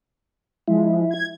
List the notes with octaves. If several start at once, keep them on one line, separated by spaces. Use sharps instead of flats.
F3 G#3 E4
G#6